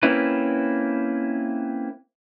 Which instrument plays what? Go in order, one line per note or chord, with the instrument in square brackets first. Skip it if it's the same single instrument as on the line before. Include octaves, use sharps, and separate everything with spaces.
[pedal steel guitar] A#3 C4 C#4 E4 B4